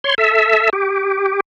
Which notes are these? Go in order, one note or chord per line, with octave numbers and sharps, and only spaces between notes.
C#5 C6
A4 E5
G4